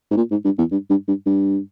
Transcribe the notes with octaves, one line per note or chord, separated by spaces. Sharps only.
G#2
A#2
G#2
G2
E2
G2
G2
G2
G2